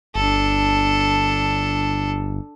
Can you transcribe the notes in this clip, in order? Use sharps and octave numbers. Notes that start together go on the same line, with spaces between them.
G1 D4 A4